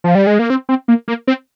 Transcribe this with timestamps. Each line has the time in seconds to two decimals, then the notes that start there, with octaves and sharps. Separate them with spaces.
0.04 F3
0.15 G3
0.27 G#3
0.39 A#3
0.50 C4
0.69 C4
0.88 A#3
1.08 A#3
1.27 C4